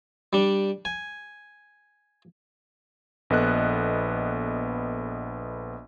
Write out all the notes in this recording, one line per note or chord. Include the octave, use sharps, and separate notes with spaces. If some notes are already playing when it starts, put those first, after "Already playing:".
G3 D4
G#5
A#1 B3 A4 D#5 F#6